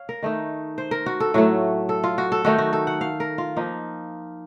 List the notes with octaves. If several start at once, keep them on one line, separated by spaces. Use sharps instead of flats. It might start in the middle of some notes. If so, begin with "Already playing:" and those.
Already playing: C#5 F5
A#4
D#3 A3 D#4
C5
A#4
F#4
A4
A2 F#3 A3 F#4
A4
F4
F#4
A4
D#3 A3 D#4 F#4
F#4
A4
F#5
F5
A#4
F4
F3 A#3 D#4